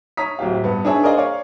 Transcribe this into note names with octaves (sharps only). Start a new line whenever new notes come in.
C#5 A#5 D#6 B6
D1 F#3 G4 F5
G2 B3
D4 D#4 G#4 C#5 E5
G#4 A#4 C5 D5 D#5 F5
C#5 D5 F5 C#6